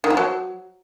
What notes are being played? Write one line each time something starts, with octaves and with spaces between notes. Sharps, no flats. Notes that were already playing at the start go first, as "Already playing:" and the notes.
D#3
F3
F#3